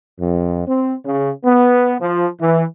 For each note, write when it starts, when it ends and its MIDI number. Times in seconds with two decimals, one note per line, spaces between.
0.20 0.65 41
0.68 0.95 60
1.05 1.31 49
1.45 1.96 59
2.01 2.27 53
2.41 2.65 52